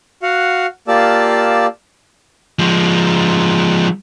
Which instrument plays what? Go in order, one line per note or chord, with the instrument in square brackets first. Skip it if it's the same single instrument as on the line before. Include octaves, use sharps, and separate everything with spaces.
[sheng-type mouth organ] F#4 F5 F#5
A#3 F4 G4 D5 A5 E6
[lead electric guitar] F3 G#3